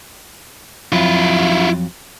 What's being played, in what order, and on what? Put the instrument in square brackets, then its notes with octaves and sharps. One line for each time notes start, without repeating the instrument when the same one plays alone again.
[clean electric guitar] F2 F#3 [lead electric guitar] E4 F4